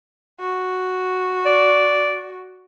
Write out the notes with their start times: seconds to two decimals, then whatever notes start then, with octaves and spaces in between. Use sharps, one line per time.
0.40 F#4
1.46 D5